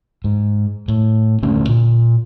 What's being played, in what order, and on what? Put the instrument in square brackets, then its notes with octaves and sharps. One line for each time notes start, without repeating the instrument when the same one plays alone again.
[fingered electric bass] G#2
A2
D#1 D3 A3 C#4
A#2